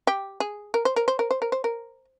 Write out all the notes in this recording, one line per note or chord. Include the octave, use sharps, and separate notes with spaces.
G4
G#4
A#4
C5
A#4
C5
A#4
C5
A#4
C5
A#4